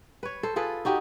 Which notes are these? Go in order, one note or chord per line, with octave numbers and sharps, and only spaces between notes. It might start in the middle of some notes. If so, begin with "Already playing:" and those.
B4 C#5
A4 C5
F4 G#4 A4 B4
D#4 F#4 G4 D#5